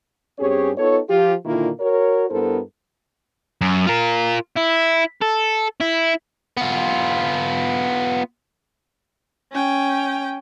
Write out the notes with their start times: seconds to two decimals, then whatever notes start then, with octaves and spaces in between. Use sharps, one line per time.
0.39 G2 C4 C#4 G4 G#4 C#5
0.77 B3 D#4 F4 A4 C#5
1.09 F3 F4 G4
1.45 A#2 D3 D#3 A#3 E4 F4
1.79 F#4 A#4 C#5
2.30 G2 B3 E4 A4 A#4 C5
3.61 F#2
3.87 F4 A#4
4.56 E4
5.21 A4
5.81 E4
6.57 B3 F4
9.52 C#4 G5